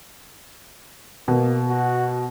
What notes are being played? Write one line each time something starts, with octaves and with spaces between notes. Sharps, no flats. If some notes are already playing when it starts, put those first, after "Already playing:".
B2 A#3
F#4